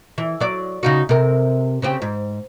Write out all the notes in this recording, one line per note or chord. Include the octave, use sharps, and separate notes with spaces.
E3
F#3 D5
C#3 D#4 F#4
C3 A#4
C#3 C4 G4
G#2